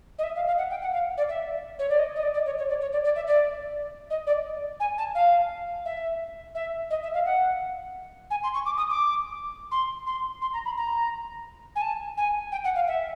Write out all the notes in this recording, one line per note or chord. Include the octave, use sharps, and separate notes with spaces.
D#5
E5
F5
F5
F#5
G5
F#5
F5
D5
E5
C#5
D5
D#5
D#5
D5
D5
C#5
C#5
D5
C#5
D5
D5
E5
D5
D#5
D5
G#5
A5
F5
E5
E5
D#5
E5
F5
F#5
G#5
C6
C#6
D6
D#6
D6
C6
C6
C6
A#5
B5
A#5
G#5
A5
G#5
G5
F#5
F5
E5